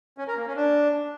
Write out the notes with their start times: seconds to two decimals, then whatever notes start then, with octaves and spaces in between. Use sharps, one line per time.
0.18 C#4
0.27 A#4
0.37 A#3
0.46 C#4
0.56 D4